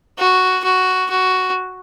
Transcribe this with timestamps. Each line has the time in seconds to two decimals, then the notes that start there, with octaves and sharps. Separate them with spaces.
0.18 F#4
0.64 F#4
1.10 F#4